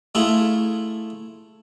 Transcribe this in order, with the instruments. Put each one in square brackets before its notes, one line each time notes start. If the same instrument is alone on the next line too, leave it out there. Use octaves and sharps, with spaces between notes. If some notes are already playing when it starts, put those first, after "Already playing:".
[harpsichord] A3 E4 F4 G#4